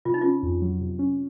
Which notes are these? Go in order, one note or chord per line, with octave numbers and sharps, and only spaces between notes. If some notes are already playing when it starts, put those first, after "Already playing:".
C3 F4
D#4
C#4 F4
F2
F#3
C3
C#4